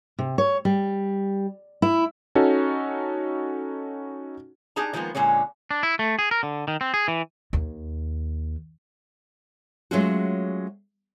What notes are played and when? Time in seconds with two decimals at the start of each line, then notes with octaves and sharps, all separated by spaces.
0.19 C3
0.38 C#5
0.65 G3
1.82 E4
2.35 C#4 D#4 F#4 A4
4.76 D4 D#4 G#4 A5 A#5
4.93 D#3 F3 G#3 A#3 B3
5.15 A#2 D3 G#3 C#4
5.71 D4
5.83 E4
5.99 A3
6.19 G#4
6.31 A#4
6.43 D3
6.68 D#3
6.81 C4
6.94 G#4
7.08 E3
7.53 D#2
9.91 F#3 G#3 A3 C#4 F4 F#4